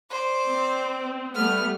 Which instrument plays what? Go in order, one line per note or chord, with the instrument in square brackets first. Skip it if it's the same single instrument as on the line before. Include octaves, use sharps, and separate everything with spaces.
[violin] C5 D5
[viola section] C4
[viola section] G3 A3 B3 [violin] F6